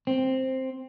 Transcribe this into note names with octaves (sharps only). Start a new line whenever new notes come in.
C4